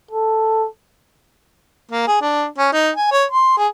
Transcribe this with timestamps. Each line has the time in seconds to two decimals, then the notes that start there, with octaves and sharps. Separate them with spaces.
0.11 A4
1.92 A#3
2.07 G#4
2.22 D4
2.58 C#4
2.73 D#4
2.96 G#5
3.12 C#5
3.32 C6
3.58 G#4